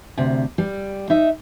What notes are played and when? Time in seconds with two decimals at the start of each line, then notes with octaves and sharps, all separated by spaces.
0.17 D2 C3
0.58 G3
1.10 D#4 E5